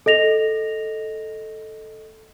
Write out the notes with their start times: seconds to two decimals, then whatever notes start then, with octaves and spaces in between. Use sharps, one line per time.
0.06 A4 D#5 A#6 F7